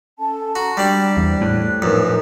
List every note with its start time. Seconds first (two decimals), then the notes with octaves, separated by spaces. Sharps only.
0.19 C#4 A4 A5
0.56 F#4 A#5 C6
0.77 G3 D4 D5 G5
1.17 E2 C5 D5
1.41 A2 F#6
1.82 A#1 F#2 D#4 B4